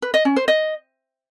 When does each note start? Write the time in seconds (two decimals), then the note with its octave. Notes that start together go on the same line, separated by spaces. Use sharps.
0.02 B4
0.14 D#5
0.25 C#4
0.36 C5
0.48 D#5